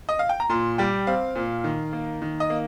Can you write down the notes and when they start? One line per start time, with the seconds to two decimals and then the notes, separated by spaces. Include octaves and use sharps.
0.09 D#5
0.19 F5
0.29 G5
0.40 A#5
0.49 A#2 C6
0.78 G3 G5
1.07 C4 F5
1.35 A#2
1.64 D#3
1.93 A#3
2.22 D#3
2.40 D#5
2.50 A#3